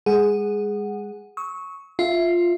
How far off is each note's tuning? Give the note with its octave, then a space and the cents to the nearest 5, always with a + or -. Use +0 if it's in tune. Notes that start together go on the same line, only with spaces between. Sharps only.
G#3 -30 G#4 +0 F#5 +0
C#6 +0 E6 -45
F4 +0 E5 +0